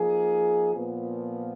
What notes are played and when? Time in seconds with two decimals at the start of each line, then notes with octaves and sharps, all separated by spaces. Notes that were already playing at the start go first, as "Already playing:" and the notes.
Already playing: F3 A#3 D#4 G#4
0.73 A#2 F3 B3